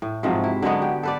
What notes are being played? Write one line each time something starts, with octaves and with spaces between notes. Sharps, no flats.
A2
G#2 C3 F3 F#3
E4
D3 F#3 G#3 B3
G4
A4 B4 D5